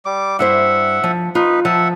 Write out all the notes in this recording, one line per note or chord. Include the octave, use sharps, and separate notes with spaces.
G3 D6
G2 E4 C5 E5 F#5
F3
D#4 F4 B4
F3 E5 F#5 A5